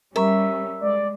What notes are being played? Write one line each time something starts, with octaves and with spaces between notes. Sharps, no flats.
G3 C#4 A#4 E5 A#5 C#6
G#3 D5